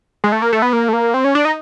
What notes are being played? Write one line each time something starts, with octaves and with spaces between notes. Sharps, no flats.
G#3
A3
A#3
A3
B3
A#3
A3
A#3
C4
C#4
D4
D#4